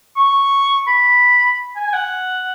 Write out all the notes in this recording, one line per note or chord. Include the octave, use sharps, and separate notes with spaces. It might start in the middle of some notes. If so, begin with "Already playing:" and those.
C#6
B5
G#5
G#5
F#5